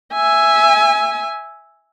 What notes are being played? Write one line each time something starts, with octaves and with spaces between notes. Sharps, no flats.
E5 G#5